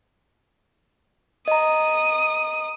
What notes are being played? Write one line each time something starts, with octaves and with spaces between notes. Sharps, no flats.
D#5 A#5 D#6